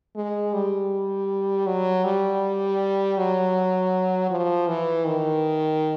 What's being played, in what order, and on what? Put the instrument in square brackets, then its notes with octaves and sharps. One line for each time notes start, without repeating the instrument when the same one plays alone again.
[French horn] G#3
G3
F#3
G3
F#3
F3
E3
D#3